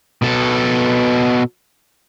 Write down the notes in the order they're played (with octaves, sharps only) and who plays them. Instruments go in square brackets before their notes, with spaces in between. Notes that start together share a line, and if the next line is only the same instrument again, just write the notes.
[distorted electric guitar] B2 A4